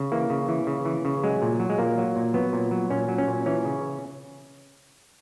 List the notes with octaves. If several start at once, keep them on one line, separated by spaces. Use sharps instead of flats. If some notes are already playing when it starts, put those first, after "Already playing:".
Already playing: C#3
E3 A#3
C#3
E3
C#3
E3
C#3
F#3 G#3
A#2
F#3
G#3
A#2 A#3
F#3
A#2
F#3 B3
A#2
F#3
A#2 C#4
F#3
C#4
A#2
E3 C#4
C#3